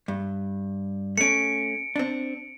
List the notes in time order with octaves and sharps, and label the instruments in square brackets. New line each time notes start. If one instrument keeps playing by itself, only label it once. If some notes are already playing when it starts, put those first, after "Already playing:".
[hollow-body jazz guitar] G2
[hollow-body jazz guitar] A3 C#4 [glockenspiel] C#7 D7
[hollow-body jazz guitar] C4 D4